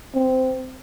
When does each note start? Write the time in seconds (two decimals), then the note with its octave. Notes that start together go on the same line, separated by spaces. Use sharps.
0.15 C4